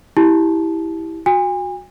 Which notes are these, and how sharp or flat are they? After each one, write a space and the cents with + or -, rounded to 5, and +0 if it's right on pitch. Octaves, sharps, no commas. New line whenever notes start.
E4 -10 G4 +0 A5 -20
F#4 -20 G#5 -40